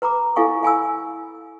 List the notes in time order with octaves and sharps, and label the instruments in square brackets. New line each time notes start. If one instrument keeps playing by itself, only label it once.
[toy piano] B4 A#5 B5 D6
E4 A4 F5 G#5 C#6
F5 G#5 B5 E6